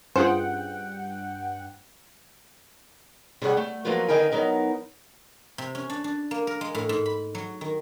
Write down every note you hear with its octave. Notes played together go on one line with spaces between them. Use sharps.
G2 C#4 F4 G#4 C5 F#5 G5
C3 G3 C#4 G#4 D#5 F#5
A3
F3 F#3 A#3 B3 F4 F#4
D3 D#3 D#4 A#4 G5 G#5
F#3 B3 D#4 A#4
C3
C#4
D4
D4
A#3
A#4
G#3
A2
G#2
B5
F#3
D#3